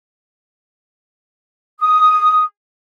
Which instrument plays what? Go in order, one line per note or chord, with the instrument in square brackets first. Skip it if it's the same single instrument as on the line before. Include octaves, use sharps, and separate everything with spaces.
[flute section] D#6